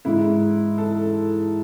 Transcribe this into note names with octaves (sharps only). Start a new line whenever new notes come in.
G#2 E3 G#3 E4
A4